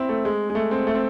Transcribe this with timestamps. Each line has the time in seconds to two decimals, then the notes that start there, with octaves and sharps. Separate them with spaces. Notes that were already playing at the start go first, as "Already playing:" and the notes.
Already playing: C4 E4
0.09 A3
0.25 G#3
0.50 G#3
0.55 A3
0.71 C4
0.87 A3
0.94 C4